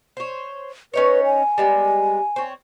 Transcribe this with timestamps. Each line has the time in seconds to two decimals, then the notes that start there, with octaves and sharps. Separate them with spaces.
0.17 C5 C#5
0.94 C#4 D#4 B4 C#5
1.25 G#5
1.58 G3 G#3 B3
2.36 C4 C#5